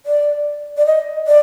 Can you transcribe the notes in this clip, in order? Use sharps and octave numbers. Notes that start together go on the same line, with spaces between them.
D5
D5
D#5
D5